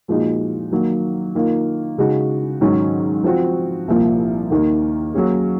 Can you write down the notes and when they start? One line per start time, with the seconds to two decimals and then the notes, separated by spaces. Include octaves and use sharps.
0.08 A#2 F3 G#3 D#4 F#4
0.71 D#3 F#3 A#3
1.35 D#3 A#3 F4 A#4
1.98 C#3 G#3 D#4 F#4
2.61 G#2 D#3 F#3 C#4
3.24 F3 C4 F#4
3.88 C2 A#2 F3 A#3
4.51 D#2 D#3 A#3
5.14 F#3 A#3 C#4 G#4